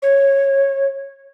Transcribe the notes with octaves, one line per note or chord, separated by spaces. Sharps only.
C#5